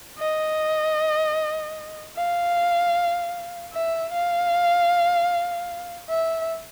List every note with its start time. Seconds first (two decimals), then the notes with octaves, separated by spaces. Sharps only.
0.19 D#5
2.16 F5
3.73 E5
4.12 F5
6.10 E5